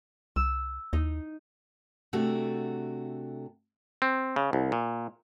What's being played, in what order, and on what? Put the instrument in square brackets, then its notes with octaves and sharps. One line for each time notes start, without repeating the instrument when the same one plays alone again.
[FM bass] C2 [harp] E6
[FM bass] D#2 [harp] D#4
[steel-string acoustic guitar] C3 A3 D4 F#4 A4
[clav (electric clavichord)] C4
C#3
C2
A#2